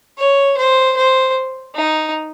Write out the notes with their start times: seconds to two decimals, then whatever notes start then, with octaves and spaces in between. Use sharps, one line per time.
0.18 C#5
0.57 C5
0.97 C5
1.75 D#4